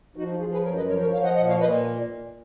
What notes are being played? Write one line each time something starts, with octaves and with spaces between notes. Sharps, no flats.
F3 D#4 F#4
F3 F4 G#4
G#4 B4
F#2 A#4 C#5
B4 D#5
F3 A#4 C#5
A#4 C#5
F3 C#5 F5
D#5 F#5
A#2 D#5 F#5
C#5 F5
A#2 B4 D#5